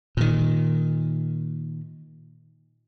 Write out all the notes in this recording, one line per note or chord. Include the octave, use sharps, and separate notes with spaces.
A#2 D#3